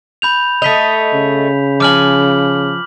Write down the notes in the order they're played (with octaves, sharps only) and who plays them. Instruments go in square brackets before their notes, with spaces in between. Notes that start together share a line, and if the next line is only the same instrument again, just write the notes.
[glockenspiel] B5 G6 F7
[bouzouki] A3 D#5 [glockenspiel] B6 F7
[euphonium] C#3
[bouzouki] F3 G#5 [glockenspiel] D6 F6 F#7